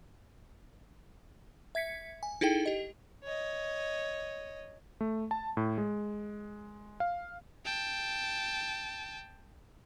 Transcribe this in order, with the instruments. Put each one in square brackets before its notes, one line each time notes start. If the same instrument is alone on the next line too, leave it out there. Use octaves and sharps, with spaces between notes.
[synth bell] E5 G#6 B6 C#7
G#5
D#4 E4 G#4 A4 G5
G4 D#5
[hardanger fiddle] C#5 D#5
[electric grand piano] A3
A5
A2
G#3
F5
[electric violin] G5 A5